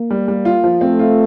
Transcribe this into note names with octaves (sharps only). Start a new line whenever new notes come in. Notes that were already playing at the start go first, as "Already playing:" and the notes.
Already playing: A#3
G3
G3
F4
F3
A3 C4
F4